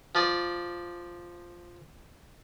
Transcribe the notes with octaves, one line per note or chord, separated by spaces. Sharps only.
F3 D5 D#6